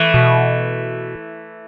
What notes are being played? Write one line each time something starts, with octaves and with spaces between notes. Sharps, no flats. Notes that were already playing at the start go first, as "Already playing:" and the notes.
Already playing: E3 A3
B2